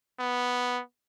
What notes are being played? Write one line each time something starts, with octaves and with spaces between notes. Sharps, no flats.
B3